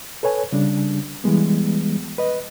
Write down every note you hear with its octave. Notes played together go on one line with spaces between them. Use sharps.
A4 B4 C#5 G#5
C#3 G3 D4
E3 G3 G#3 B3
B4 D#5